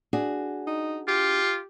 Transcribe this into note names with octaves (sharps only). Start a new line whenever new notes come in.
D4 F#4 G#4
D#4
F4 G4